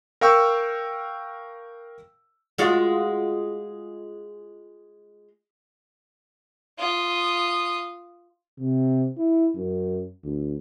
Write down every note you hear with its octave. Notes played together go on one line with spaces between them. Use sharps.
A#4 F5 G5 C#6 E6
G#3 F4 F#4
F4 D#6
C3
E4
F#2
D2